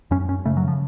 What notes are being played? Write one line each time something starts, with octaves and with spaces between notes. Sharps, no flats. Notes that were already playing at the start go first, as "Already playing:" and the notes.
F#2 C#4
F#2 C#4
C#3 A3
F#3
C#3 F3